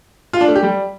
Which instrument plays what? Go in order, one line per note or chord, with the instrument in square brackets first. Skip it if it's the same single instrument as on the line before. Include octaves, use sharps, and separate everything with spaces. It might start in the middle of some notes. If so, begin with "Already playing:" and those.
[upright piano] F4
D4
A3
G4
G3